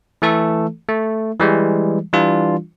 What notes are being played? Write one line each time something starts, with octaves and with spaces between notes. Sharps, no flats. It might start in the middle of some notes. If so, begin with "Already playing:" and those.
E3 A3 A4
A3
E3 G3 G#3
E3 G3 D4 F4